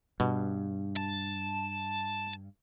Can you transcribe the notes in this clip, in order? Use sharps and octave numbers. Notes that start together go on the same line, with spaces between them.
G2 B2
A5